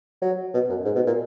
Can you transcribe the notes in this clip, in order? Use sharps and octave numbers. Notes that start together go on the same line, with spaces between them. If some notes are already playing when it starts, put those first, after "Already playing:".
F#3
B2
F#2
G#2
B2
A#2